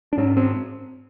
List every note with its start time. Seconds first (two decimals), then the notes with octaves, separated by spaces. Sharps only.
0.13 D4
0.17 G#2 C#4
0.37 C4